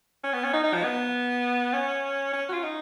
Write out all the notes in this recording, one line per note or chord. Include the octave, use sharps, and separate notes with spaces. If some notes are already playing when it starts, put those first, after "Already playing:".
C#4
B3
C#4
D#4
D#4
F3
B3
C#4
C#4
F#4
F4
D#4